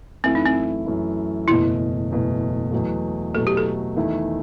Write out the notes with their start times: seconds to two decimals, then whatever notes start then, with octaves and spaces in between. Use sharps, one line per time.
0.24 F#2 E3 A3 C4 E4
0.35 D#4
0.46 C4
0.86 F#2 E3 A3 E4
1.48 F#1 E2 B2 A3 E4
2.11 F#1 E2 B2 A3
2.72 E2 B2 F#3 A3
3.34 E2 B2 F#3 A3 A4
3.47 G4
3.57 A4
3.96 E2 D#3 A3 E4